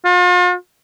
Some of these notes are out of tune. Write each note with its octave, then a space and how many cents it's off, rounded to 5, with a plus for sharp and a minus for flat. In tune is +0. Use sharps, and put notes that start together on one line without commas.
F4 +40